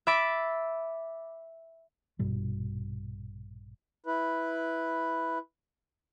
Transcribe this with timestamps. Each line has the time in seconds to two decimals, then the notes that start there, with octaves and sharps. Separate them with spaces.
0.07 E5 B5 D6 A6
2.19 A#1 G2 B2 G3
4.06 E4 B4